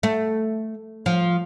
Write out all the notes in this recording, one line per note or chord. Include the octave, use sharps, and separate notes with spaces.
A3
F3